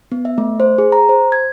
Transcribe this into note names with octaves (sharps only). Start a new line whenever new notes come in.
B3
E5
A3
C5
G#4
A#5
C5
G#6